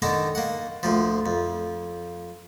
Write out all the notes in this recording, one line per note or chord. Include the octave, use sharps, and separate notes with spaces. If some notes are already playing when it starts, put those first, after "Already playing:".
D3 D#3 D#4 A5 A#5
A#3 F#5
D2 A#2 F3
F2